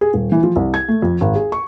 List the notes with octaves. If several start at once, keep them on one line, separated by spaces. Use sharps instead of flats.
G#4
D#1
E3
F3
C2
G#6
A3
F2
G#1
G#4
C#6